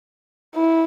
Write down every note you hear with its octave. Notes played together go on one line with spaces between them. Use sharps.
E4